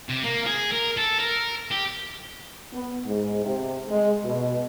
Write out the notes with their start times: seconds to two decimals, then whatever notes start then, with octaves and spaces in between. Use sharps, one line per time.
0.09 C3
0.23 A#3
0.46 G#4
0.72 A#4
0.97 A4
1.19 A#4
1.71 G4
2.73 B3
3.05 G#2
3.44 C3
3.89 G#3
4.24 B2